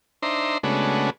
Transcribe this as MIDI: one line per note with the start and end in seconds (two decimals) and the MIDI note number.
0.23 0.58 62
0.23 0.58 63
0.23 0.58 72
0.23 0.58 76
0.23 0.58 82
0.23 0.58 84
0.63 1.10 49
0.63 1.10 56
0.63 1.10 57
0.63 1.10 59
0.63 1.10 62
0.63 1.10 66